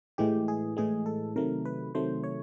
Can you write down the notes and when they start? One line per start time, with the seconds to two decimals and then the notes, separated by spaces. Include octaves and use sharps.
0.18 A2 E3 G#3 G4
0.48 G#4
0.77 A2 E3 G#3 G#4
1.06 A4
1.36 C3 D#3 F#3 A3 A#4
1.65 B4
1.95 C3 D#3 F#3 A3 C5
2.24 C#5